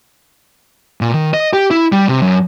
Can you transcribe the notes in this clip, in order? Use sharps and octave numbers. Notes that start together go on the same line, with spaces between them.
A#2
D#3
D#5
G4
E4
G3
C3
F#2